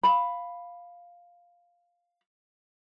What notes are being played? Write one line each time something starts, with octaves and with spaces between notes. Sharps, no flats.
F5 B5